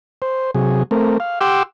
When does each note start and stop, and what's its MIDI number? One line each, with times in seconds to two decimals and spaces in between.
0.22 0.51 72
0.55 0.83 48
0.55 0.83 54
0.55 0.83 68
0.91 1.18 57
0.91 1.18 60
0.91 1.18 70
1.20 1.39 77
1.41 1.63 67
1.41 1.63 78
1.41 1.63 79
1.41 1.63 84
1.41 1.63 86
1.41 1.63 88